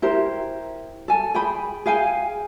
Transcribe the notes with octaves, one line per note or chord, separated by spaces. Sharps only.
E4 G4 A#4 C5
A4 G#5
G#4 G5 B5
G#4 F5 G5 G#5